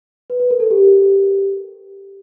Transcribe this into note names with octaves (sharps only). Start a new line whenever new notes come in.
B4
B4
A#4
A4
G4